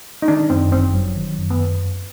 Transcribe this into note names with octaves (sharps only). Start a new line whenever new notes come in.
D#4
D#3 D4
F#2 C4
G1 C4
F#3
D#3
F#2
B3